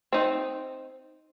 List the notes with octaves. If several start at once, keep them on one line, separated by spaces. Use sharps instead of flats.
C4 D#4